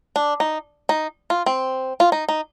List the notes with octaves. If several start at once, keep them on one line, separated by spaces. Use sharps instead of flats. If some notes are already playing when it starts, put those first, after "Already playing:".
D4
D#4
D#4
F4
C4
F4
D#4
D#4